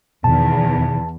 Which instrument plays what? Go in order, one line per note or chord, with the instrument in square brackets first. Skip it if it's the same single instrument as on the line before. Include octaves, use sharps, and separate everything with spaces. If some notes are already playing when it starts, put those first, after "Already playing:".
[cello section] E2 [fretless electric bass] B2 D#3 [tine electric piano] A5